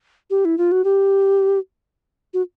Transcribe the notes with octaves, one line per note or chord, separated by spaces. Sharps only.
G4
E4
F4
F#4
G4
F#4